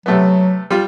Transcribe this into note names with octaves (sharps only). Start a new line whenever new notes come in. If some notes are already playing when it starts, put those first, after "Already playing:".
C3 F#3 A3 B3
G3 F4